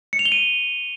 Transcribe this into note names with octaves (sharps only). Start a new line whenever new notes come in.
C#7
F7
G7
D#7